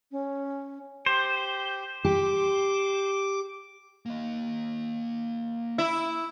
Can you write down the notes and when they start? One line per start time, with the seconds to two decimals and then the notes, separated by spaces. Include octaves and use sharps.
0.12 C#4
1.06 G4 C5
2.05 G4 D6
4.06 A#3 D#5
5.78 E4